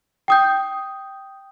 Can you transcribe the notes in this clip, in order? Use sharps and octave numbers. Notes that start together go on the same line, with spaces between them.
G5 D#6 G6